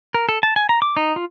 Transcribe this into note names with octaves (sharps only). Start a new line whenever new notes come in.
A#4
A4
A5
G#5
A#5
D6
D#4
F4